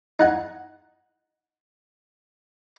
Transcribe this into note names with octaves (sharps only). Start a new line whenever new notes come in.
D#4 F#5 G#5